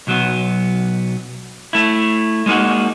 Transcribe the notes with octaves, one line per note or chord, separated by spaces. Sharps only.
B1 F#3 B3
A3 E4
G#3 A#3 C#4 D#4 F#4